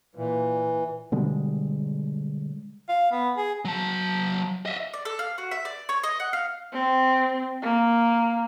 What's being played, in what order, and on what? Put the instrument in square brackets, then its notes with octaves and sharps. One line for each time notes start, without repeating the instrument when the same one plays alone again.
[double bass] A#2 [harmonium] E3
[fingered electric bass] B2 D3 G3 G#3
[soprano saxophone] F5
B3
G#4
[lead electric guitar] F#3 A5
D#5 E5
[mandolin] D5
A4
F5
F#4
E5
D5
C#5
D#5
F#5
F5
[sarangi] C4
A#3